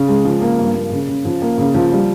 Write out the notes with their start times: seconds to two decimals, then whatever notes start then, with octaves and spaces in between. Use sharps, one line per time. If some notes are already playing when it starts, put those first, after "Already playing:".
Already playing: C#3
0.08 G#3
0.25 F3
0.41 A#3
0.59 G2
0.75 A#3
0.91 C#3
1.08 C#3
1.25 F3
1.42 A#3
1.58 C#3
1.75 F3
1.92 G3